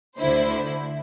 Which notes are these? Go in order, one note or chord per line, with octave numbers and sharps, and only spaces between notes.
D2 D3 E4 C5